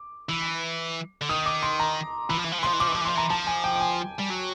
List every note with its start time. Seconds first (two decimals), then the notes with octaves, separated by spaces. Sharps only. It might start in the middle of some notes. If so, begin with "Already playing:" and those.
Already playing: D6
0.29 E3
1.22 D3
1.29 D#3 D#6
1.46 D6
1.63 C6
1.80 A#5
2.29 E3 B5
2.37 F3
2.44 E3
2.52 F3
2.58 E3
2.63 C6
2.66 F3
2.73 E3
2.80 F3 D6
2.87 E3
2.93 F3 D6
3.01 E3
3.05 C6
3.08 F3
3.15 E3 A#5
3.30 F3 A5
3.47 G#5
3.64 G5
3.76 G5
3.80 G#5
4.19 G3
4.31 F#3